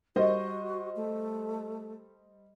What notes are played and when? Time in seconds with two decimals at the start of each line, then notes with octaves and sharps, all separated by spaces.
0.16 G3 F#4 C5 D#5
0.96 A3